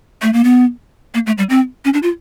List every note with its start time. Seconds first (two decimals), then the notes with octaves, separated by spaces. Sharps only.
0.22 A3
0.33 A#3
0.44 B3
1.14 A#3
1.26 A3
1.38 G3
1.50 C4
1.85 C#4
1.93 D4
2.03 F4